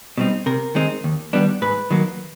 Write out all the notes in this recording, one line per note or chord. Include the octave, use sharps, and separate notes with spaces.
B2 G3 C4 D#4
C3 A#4
D#3 G#3 C4 D#4
D#2
D#3 G3 B3 D4
G#2 B4
D#3 F#3 A#3